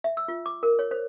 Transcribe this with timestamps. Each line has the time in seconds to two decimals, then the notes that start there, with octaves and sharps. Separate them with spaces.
0.04 E5
0.17 E6
0.28 F4
0.46 D6
0.63 A#4
0.79 C#5
0.91 C5